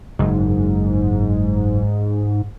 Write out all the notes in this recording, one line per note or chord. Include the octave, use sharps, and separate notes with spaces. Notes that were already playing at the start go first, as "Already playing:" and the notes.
F#1 G#2